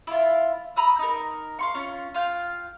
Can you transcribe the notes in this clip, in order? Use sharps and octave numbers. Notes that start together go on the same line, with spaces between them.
E4 F4
A#5 B5 D#6 E6
D#4 A#4
F5 C6 C#6
C#4 F4
F4 F5 G5